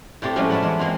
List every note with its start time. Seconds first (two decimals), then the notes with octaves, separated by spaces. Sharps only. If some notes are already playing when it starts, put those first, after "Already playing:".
0.22 A2 A3 C4 G4 D5
0.36 F3 F#3 G#3 A3 C#4 F4
0.50 E4 A4 B4 D5 F#5
0.62 E3 G#3 B3
0.79 G#3 A#3 C4 F4